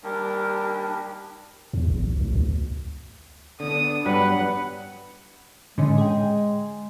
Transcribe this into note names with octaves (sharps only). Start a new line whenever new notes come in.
D#2 G3 D4 A#4
E2
A1
B1
D2
D2
D3 B3 D4 D#6
G2 F#3 G3 B4 F#5
A2 D3 G#3 C#4
G#4 G5